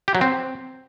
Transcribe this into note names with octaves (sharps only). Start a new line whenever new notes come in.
G4
F#3
C4